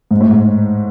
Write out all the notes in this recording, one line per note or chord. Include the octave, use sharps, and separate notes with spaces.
G#2
A2
G#2